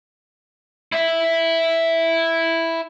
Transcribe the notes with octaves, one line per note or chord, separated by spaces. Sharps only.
E4 E5